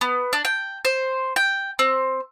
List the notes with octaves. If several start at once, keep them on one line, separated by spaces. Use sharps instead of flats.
B3
D4
G5
C5
G5
C4